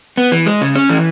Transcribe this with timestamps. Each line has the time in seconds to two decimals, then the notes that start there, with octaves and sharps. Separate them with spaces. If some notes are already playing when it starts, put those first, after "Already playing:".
0.17 B3
0.32 E3
0.46 G#3
0.61 C#3
0.75 C#4
0.89 E3